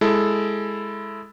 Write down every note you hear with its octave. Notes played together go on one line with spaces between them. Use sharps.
G#3 E4 A4